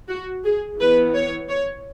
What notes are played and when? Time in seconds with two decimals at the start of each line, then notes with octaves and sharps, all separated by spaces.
0.08 F#4
0.43 G#4
0.78 E3 B3 B4
1.14 C#5
1.48 C#5